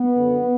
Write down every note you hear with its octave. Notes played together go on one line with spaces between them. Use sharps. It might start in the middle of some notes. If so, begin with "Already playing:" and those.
Already playing: B3
F#2 D3 F#3